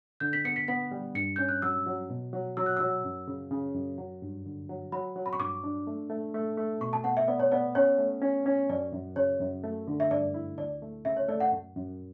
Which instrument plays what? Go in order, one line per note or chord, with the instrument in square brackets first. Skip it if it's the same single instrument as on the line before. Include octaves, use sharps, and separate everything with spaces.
[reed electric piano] D3 [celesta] G6
[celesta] B6
[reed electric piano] B3 [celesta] C#7
[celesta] B6
[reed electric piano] B3 [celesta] B6
[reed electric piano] G3
[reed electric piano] G2 [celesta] C#7
[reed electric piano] C#4 [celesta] G6
[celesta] F#6
[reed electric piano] F#3 [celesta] E6
[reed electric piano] F#3
B2
F#3
[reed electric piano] F#3 [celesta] E6
[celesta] F#6
[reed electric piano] F#3 [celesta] E6
[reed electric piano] F#2
C#3
C#3
F#2
F#3
G2
D3
F#3
[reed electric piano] F#3 [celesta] B5
[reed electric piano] F#3
[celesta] B5
C#6
[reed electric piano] G2 [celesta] D6
[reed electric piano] D4
A3
A3
A3
A3
[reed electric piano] B2 [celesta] C#6
[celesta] A5
[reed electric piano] B3 [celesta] F#5
[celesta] E5
[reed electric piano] B3 [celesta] D5
[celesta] C#5
[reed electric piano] B3 [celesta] D5
[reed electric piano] C#4 [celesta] C#5
[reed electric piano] A3
C#4
C#4
[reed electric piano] F#2 [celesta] D5
[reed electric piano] F#2
[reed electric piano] C#3 [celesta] C#5
[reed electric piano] F#2
A3
D3
[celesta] E5
[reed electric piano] G2 [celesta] D5
[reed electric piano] E4
[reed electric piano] D2 [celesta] D5
[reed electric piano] A3
[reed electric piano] C#3 [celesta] E5
[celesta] C#5
[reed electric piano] A3 [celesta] D5
[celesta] F#5
[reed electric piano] F#2
F#2